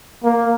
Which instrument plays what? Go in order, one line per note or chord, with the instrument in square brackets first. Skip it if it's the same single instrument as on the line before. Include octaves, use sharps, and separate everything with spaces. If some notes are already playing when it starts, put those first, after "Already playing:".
[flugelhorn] A#3